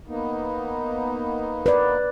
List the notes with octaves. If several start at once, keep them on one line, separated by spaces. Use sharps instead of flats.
A#3 B3 D#4
B4 D5